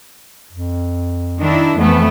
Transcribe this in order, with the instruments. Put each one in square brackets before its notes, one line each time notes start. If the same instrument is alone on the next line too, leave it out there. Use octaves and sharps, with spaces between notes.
[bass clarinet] F2
[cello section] D#3 D4 E4
[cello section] F2 A3 B3 [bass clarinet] E3